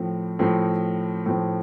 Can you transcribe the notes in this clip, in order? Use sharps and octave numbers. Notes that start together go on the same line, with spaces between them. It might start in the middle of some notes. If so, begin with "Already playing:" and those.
Already playing: A2 F3 C4
A2 F3 C4
A2 F3 C4